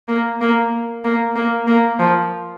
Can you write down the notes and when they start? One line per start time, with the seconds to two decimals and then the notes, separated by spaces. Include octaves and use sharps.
0.08 A#3
0.41 A#3
1.04 A#3
1.36 A#3
1.67 A#3
1.99 F3